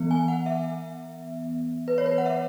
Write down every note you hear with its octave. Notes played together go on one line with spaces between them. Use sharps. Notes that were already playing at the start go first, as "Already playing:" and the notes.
Already playing: E3 B3
G#5
F#5
E5
B4
C#5
B4
F#5
E5
C#5